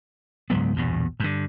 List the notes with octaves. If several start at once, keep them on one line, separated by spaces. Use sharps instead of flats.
C#2 G#2 F#3 B3
A#1 E2 G2 B2
G2 D3